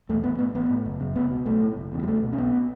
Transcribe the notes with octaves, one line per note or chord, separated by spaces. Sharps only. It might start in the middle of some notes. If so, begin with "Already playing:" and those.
E2 B2 A3
A1 B3
A2 B3
A1 B3
A2
F#1
F#2 C#3
C#2 B3
B2
B1 A3
A2
F#1
E2 C#3
F#3
C#2 A3
B2
C#4
B1 B3
B2